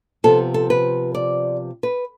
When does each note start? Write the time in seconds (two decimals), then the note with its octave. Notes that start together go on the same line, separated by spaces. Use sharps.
0.24 C3 F3 B3 A4
0.54 A4
0.70 B4
1.15 D5
1.83 B4